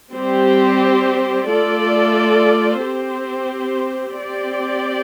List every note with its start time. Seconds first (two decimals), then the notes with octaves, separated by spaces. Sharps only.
0.13 G3 C4 G4 C5
1.48 A3 F4 A4 D5
2.81 C4 G4 C5
4.16 C4 G4 D5